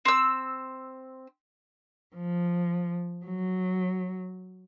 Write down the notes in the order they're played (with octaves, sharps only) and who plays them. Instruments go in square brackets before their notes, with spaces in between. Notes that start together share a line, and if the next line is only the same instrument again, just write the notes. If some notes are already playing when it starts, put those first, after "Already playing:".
[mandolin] C4 E6
[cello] F3
F#3